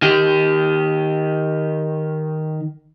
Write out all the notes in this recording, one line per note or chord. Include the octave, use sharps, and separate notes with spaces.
D#3 G4